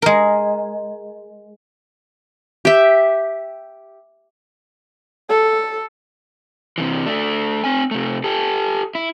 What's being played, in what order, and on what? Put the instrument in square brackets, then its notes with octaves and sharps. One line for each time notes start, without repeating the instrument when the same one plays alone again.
[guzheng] G#3 A#4
[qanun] G4 E5
[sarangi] A4
[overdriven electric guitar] C3 E3
A3 D4
C4 G#5
C3 A3
G4 A4
E4